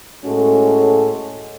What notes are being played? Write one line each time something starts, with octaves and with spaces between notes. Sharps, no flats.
A2 G#3 C#4 F#4 A4